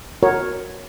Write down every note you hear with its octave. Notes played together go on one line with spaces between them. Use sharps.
F#4 A#4 C#5